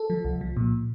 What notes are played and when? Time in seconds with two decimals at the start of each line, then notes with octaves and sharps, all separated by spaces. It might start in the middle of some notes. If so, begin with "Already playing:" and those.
Already playing: A4
0.10 F3
0.25 C2
0.41 F3
0.57 A#2